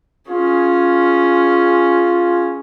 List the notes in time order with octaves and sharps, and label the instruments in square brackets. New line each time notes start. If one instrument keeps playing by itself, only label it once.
[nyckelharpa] C#4 G#4 [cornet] F4